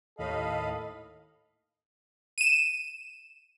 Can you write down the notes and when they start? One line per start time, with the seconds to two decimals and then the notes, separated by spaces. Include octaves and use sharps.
0.19 D#2 A2 A4 D#5 F5 B5
2.38 D#7 E7